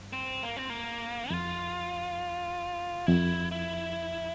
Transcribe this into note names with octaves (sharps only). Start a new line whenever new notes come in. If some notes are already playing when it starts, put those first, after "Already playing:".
Already playing: G2
C4
A#3
C4
A#3
F2 F4
F2 E4
E4